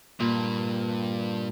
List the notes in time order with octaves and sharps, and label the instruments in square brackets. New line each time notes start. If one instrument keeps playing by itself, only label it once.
[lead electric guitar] G2 [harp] A#2